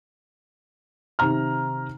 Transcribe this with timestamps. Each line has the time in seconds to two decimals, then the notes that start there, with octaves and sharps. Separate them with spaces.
1.19 C3 D#3 A#5 F6